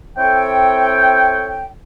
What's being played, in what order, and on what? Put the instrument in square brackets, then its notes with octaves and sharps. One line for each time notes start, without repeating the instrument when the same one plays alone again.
[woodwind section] C4 E4 A4 C#5 G5